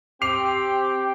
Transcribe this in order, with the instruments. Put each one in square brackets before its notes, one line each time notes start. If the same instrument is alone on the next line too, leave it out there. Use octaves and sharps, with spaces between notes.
[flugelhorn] C4 [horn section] G4 [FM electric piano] D6 [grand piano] C7 F7